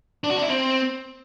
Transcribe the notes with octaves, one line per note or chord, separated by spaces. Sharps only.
D4
F#4
D4
E4
C4